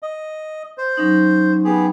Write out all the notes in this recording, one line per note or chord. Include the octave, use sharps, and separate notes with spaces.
D#5
C5
F#3 C#4 D#4
B3 G4 G#4